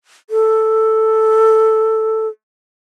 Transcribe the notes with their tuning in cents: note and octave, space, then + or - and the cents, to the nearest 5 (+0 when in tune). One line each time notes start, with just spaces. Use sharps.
A4 +0